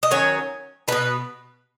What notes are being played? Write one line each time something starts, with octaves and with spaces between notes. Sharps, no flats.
D#5
D#3 F#3 C#4 C#5
B2 B3 D#4 B4